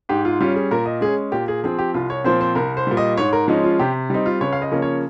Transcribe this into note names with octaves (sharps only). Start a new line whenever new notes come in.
G#2 G4
F4
G3 C#4 F4
G#4
A#2 A#4
D#5
G#3 C#4 G#4
A#2 G4
G#4
F3 C4 G#4
G4
C2 F4
C#5
A#2 F3 C4 C5
C5
C2 A#4
C5
A#2 G3
D#5
G#2 C#5
A#4
F3 G#3 C#4 D#4
F4
C3 G4
G3 C4 D#4
F4
C#2 C#5
F5
D#5
C#3 F3 A#3 C#4
C#5